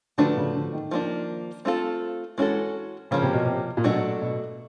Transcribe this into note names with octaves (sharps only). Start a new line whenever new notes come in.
D3 F3 A3 D4 F#4 B4
C#3
D3
D#3
F3 A#3 D4
A3 C4 F4 A4
E3 G#3 C#4 F#4 A4
C#3 F3 A#3 C#4
C3
B2
C3
A#2
B2 F#3 A3 D4 F#4
B2